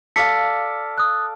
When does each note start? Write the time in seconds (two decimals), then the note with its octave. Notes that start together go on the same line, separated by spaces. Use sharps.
0.16 A4 D5 F5 B6 C#7
0.98 D#6 F#6